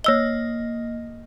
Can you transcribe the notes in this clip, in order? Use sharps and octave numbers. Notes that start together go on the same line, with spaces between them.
A#3 C#5 D#5 E6 G7